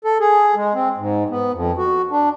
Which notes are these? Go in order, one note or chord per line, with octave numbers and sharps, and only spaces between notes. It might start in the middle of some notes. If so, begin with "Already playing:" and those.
A4
G#4
G#3
C4
G#2
B3
F2
F#4
D4